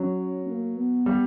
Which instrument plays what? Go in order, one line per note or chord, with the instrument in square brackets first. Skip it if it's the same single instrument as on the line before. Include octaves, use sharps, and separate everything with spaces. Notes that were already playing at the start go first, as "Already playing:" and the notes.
Already playing: [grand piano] F#3 [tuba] C#4
[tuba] A#3
B3
[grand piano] G3